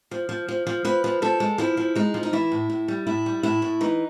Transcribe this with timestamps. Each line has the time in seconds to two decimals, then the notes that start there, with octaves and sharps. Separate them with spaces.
0.11 F3
0.29 F3
0.48 F3
0.67 F3
0.85 F3 B4
1.04 F3
1.22 F3 A4
1.40 G#3
1.58 F3 E4
1.77 F3
1.95 G#3 D#4
2.14 F3
2.23 D#4
2.33 E3 E4
2.52 A2
2.70 A2
2.88 G3
3.07 A2 E4
3.26 G3
3.43 A2 E4
3.62 A2
3.81 E3 D#4